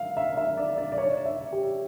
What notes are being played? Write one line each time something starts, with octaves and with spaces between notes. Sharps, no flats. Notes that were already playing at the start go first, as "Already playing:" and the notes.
Already playing: E5 F5
E5
E5
D5
D5
D5
C#5
E5
G4